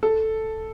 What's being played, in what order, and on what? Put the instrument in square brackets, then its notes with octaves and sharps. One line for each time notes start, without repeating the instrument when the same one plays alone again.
[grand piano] A4